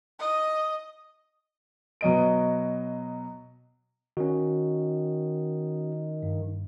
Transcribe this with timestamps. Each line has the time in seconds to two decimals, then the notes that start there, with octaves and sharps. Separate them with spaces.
0.19 D#5
2.01 B2 F#3 D#5 D7
4.17 D#3 C#4 F#4
6.23 G2